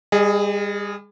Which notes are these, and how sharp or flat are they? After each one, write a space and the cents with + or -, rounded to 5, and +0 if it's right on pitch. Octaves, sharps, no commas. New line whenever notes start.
G3 +40 G#4 +0 D#5 +0